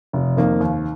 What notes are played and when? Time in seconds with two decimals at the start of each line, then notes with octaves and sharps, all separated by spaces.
0.13 F1
0.37 F2 D#3 A#3
0.61 D#2